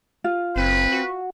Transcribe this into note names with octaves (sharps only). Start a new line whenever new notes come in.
F4
F#1 C4 B4
F#4